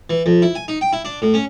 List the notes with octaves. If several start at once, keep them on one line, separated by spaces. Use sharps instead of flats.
E3
F2
E4
G#5
D#4
G5
E4
D4
A2
C#4